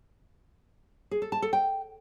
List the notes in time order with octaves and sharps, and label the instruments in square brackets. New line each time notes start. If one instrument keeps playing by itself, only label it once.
[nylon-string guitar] G#4
A4
A5
A4
G5